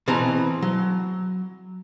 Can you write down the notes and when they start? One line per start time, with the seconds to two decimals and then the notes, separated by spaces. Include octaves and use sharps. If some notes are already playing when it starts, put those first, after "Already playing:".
0.08 B2 E3 C4 A#5
0.62 F#3